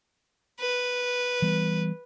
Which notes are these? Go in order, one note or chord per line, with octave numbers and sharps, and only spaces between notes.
B4
E3 G3 B3